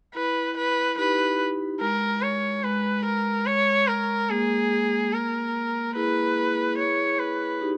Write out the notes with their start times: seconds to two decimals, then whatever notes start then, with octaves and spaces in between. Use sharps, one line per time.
0.15 E4 B4
0.57 B4
0.97 D#4 G4 B4
1.81 G#3 A#4
2.22 C#5
2.63 G#3 B4
3.05 A#4
3.46 C#5
3.88 A#4
4.29 A#3 G#4
5.13 A#4
5.95 E4 G#4 B4
6.78 C#5
7.19 B4
7.61 D#4 G4